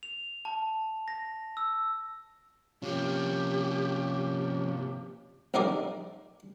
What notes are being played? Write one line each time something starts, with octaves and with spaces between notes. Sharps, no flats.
F7
A5
A#6
E6
C3 F3 A#3 C#4 G4
A#1 F2 G3 D#4 A#4 D5